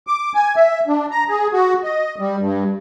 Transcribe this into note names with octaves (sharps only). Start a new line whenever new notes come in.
D6
G#5
E5
D4
A#5
G#4
F#4
D#5
G3
G2